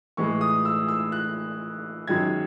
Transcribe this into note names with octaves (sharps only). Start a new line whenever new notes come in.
A2 E3 G#3 C#6
D#6
E6
E6
F#6
F#2 D#3 G#3 G#6